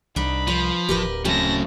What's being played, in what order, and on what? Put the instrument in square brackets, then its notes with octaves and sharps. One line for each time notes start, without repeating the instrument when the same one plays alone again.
[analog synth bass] C2 [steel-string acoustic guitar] D4 D#4 [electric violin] B5
[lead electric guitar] F3 [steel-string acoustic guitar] B4
[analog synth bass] D1 [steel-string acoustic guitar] G4 A#4 B4
[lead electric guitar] C#3 F#3 [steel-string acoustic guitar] A3 C4 C#4 [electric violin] A5 A#6